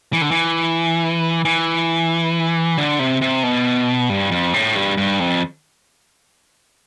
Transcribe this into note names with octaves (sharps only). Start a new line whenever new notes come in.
E3
D3
E3
E3
D3
C3
C3
B2
G2
F2
A2
G2
G2
F2